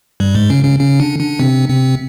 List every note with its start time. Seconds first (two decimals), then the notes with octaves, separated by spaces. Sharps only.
0.20 G2 G3
0.35 G#2 G#3
0.50 C#3 C#4
0.65 C#3 C#4
0.79 C#3 C#4
1.00 D3 D4
1.20 D3 D4
1.39 C3 C4
1.69 C3 C4